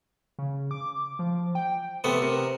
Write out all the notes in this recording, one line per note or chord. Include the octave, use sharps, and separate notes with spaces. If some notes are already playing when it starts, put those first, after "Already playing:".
C#3
D6
F3
G5
C3 A3 B3 B4
C3 A#4